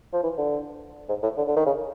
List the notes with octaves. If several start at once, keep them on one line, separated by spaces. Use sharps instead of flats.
F3
E3
D3
G#2
A2
D3
D3
D#3
C#3